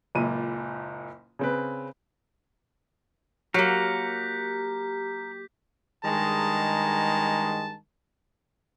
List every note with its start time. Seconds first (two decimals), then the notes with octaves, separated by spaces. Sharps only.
0.15 F#1 C#2 A#2 D#7
1.39 C#3 C4 B4
3.54 F#3 A#3 G4 A#4 F#5 G6 B6
6.04 G2 D#3 G#3 G#4 A5 A#5